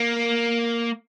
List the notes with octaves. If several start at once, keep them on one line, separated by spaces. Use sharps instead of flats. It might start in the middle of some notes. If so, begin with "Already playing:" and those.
Already playing: A#3